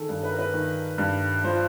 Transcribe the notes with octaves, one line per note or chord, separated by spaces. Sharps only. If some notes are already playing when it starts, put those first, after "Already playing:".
Already playing: D#3 G#4 A4
G2
B4
A#4
B4
D#3
G2
F3 C5